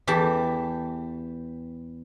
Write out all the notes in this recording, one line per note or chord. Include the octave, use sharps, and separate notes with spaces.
E2 E3 G4 A5